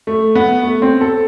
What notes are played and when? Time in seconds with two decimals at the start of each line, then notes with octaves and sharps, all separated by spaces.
0.07 A3
0.35 B3
0.63 A3
0.82 C4
1.01 A4